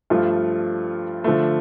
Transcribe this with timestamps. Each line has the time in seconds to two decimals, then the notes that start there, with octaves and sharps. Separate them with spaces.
0.10 G2 F3 A3 F4
1.24 D3 F3 A3